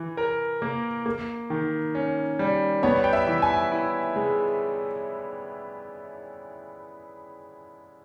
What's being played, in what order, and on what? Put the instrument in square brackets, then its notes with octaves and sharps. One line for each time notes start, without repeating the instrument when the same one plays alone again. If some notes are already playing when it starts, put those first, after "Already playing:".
Already playing: [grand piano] E3
A#4
A#3
A#3
D#3
C#4
G3
[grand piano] B3 [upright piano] C#5
[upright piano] G5
E5
[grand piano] E3
[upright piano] G#5
[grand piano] E4
G#3